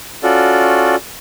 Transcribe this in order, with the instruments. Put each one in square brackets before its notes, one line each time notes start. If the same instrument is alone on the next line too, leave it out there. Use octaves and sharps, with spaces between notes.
[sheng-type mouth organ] C#4 F4 F#4 A4 D5